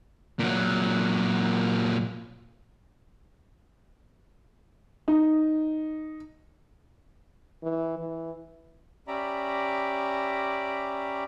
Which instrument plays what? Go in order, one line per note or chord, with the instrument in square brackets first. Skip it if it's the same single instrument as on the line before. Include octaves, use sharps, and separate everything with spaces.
[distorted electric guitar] A#2 F#3
[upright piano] D#4
[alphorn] E3
E3
[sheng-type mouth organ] C#4 G4 D5 E5 A#5 B5